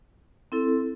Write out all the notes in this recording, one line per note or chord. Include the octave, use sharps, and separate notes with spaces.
C4 E4 A4